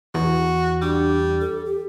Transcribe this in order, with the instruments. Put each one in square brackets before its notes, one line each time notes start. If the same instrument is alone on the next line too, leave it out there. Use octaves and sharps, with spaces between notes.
[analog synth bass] E2 [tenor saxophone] F#4
[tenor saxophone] G3 [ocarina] D4
[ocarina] A4
G4